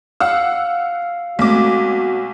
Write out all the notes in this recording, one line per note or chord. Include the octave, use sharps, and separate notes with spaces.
F5 F#5 E6
B1 G#3 A3 C4 F#4 D6